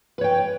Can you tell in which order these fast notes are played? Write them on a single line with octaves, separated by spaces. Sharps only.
B4 C#5 G5